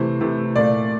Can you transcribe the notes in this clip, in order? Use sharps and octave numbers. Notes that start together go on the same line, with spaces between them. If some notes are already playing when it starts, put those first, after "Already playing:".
Already playing: C3 E3 A3 C5
C3 E3 A3
A#2 A3 D5